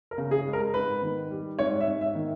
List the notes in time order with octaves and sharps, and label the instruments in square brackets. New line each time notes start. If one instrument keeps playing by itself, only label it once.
[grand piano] A#4
[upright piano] C#3
[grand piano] G#4
[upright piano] G#3
[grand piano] A#4
[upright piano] G#2 [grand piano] B4
[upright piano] D#3
G3
[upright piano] G#2 [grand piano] C#5
[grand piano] E5
[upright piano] G#2
[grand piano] E5
[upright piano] D#3